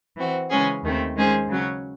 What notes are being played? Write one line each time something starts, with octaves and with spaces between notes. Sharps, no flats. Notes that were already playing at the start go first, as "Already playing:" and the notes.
E3 C4 F#4
C#3 E3 G#3 C#4 G#4
D#2 D#3 A3 C4
D#3 G#3 C#4 G#4 C5
C#3 F#3 C#4